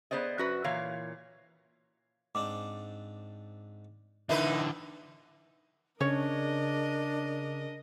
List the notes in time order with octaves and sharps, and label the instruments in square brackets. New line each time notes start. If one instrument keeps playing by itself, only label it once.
[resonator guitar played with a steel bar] B3 G#4 C5 D5 D#5
F#2 F#4 B4
A#2 E3 C#5 F5
[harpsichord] G#2 C4 D4 [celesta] D6
[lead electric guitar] D3 E3 [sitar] D4 D#4 B4 [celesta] A#4 E5
[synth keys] C#3 [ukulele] C#4 C#5 [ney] D4 [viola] A#4 D#5